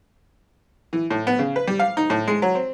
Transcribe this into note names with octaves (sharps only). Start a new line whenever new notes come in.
E3
A2
B3
C#3
B4
G3
F5
D#4
A2
G#3
F#3
C4